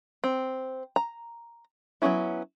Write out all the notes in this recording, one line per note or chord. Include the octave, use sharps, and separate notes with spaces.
C4
A#5
F#3 G3 B3 C#4 E4